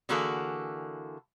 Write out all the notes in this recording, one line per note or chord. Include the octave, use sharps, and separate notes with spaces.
D3 E3 A#3 F#4 G#4 A4